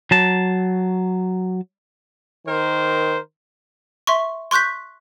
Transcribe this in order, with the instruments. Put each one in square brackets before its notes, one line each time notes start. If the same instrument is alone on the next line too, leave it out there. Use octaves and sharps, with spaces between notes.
[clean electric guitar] F#3 A5
[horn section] D#3 A#4 C5
[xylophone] E5 C6 C#6
C6 C#6 F#6 G6 B6